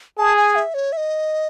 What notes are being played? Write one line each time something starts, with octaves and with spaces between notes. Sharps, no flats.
G#4 A5
G#5
E5
C#5
E5
D#5